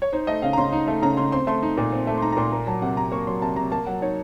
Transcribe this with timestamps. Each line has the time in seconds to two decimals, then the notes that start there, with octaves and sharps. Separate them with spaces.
0.02 C#5
0.13 D#4 C5
0.27 A3 D#5
0.42 C#3 F5
0.53 A#5
0.58 C#3 C6
0.72 D#4
0.88 A3
1.02 C#3 A#5
1.17 C#3 C6
1.32 C4 C6
1.47 A3 C6
1.63 D#4
1.77 A#2
1.92 C4
2.07 A3
2.18 C6
2.22 D#4 A#5
2.32 A#5
2.37 A#2 C6
2.52 A#3 A#5
2.67 F#3 A5
2.82 C3 F#5
2.97 C3 A#5
3.12 A#3 C#6
3.27 F#3 C6
3.42 C3 A5
3.56 C3 A#5
3.71 A#3 A5
3.87 F#3 F#5
4.02 D#4 C#5